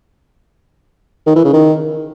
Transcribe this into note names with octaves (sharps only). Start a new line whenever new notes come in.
D#3
E3
C#3
D#3